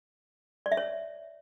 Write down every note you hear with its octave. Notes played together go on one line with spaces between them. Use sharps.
D5
E5
C#5